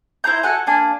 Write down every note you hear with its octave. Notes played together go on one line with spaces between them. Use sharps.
E4 C5 A#5 G6
F#4 A4 F#5 G#5
A#3 D4 G#5